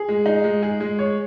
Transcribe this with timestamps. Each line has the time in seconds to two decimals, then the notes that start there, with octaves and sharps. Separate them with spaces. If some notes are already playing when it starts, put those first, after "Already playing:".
Already playing: G#4
0.08 G#3
0.26 D#4
0.44 G#3
0.63 G#4
0.80 G#3
0.99 C#5